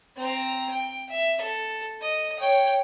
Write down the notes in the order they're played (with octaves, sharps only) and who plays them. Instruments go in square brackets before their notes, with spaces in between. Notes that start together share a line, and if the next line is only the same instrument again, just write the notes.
[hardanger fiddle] C4 A#5
G5
E5
A4
D#5
C#5 G5